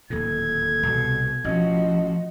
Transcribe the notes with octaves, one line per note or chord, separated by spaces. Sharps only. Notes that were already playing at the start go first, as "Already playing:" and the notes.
D1 D#2 A#2 A4 G#6
C2 B2
A1 F3 C4 C#4 F#4 D#5